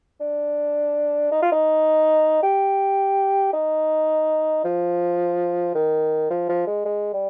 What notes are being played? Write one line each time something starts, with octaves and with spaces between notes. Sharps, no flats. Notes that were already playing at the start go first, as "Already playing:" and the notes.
D4
D#4
F4
D#4
G4
D#4
F3
D#3
F3
F3
G#3
G#3
G3